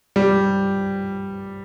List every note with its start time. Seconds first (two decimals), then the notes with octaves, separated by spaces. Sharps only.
0.16 G3